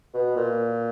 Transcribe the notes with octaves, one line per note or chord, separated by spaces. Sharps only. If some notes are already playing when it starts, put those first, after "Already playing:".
B2
A#2